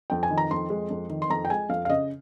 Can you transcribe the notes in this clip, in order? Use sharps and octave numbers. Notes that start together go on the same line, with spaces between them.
F2 G5
G#5
D#3
A#5
F2 C6
G#3
F2
D#3
C6
F2 A#5
G5
G#3 G#5
F2 F5
F5
C#3 D#5